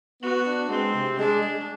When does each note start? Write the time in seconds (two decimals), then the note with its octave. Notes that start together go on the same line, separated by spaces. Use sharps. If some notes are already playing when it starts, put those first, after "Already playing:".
0.22 B3 F#4
0.47 D4
0.70 G#3 C4
0.94 C3
1.19 G#3 D4
1.42 G#3